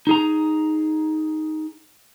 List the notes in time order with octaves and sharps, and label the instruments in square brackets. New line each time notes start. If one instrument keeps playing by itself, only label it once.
[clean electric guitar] D#4 G#4 A#5